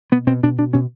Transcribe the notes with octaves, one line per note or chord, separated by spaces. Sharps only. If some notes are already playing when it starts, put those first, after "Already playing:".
B2 B3
B2 C4
B2 D4
B2 D4
B2 C#4